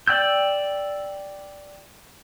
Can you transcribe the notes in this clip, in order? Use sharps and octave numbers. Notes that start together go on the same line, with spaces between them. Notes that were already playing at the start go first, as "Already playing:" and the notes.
D5 G5 E6 G6